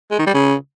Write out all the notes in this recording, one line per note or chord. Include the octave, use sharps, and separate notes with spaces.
G#3
D#3
G3
C#3